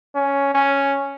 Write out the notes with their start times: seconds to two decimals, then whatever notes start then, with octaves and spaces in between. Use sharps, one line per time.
0.15 C#4
0.55 C#4